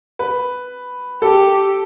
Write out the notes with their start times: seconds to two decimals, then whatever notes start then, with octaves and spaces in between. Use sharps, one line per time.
0.19 B4
1.22 G4 A4